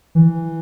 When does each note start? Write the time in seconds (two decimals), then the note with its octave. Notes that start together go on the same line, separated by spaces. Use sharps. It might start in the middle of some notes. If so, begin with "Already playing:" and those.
0.15 E3